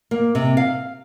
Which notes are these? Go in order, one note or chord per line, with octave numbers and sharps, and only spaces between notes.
A#3
C3
F5